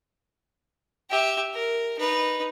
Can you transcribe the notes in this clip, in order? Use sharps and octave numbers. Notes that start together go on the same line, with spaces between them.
G4 E5
A#4
D#4 B4